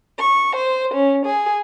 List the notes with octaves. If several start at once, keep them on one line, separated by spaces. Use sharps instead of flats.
C#6
C5
C#4
G#4